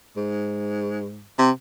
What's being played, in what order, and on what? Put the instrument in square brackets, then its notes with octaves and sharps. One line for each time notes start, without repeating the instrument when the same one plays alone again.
[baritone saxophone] G#2
C3